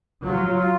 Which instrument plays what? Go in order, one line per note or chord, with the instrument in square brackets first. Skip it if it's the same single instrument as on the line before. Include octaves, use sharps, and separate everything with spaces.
[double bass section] F#3 [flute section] F4
[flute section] F4